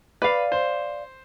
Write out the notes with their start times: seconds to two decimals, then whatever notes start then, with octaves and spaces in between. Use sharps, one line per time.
0.22 B4 D5 F5
0.52 C5